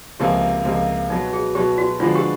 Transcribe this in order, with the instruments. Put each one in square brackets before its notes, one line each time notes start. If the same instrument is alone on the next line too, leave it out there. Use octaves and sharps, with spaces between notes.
[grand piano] C#2 C3 F3 A#3 [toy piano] G4
[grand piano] C#2 C3 F3 A#3
[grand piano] B2 F#3 B3 [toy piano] D#4
[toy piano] G#4
[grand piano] B2 F#3 B3 [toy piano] G4
[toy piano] F#4
[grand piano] D3 F3 G#3 B3 D4 [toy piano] F4
[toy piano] G4